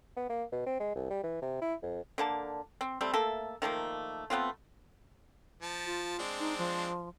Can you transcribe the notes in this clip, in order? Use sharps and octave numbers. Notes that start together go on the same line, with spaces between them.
B3
A#3
B2
C4
G#3
C2
G3
E3
C3
E4
F2
D3 A#3 A5
C4
G3 A3 C4
A3 A#3 A4 E5
D#3 F3 A3 A#3
A3 B3 C4 F4
F3 A5
F4
G#3 C4 D4
D#4
F3